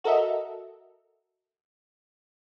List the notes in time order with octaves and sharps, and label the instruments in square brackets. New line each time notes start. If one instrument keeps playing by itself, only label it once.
[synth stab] F#4 A4 A#4 D#5 E5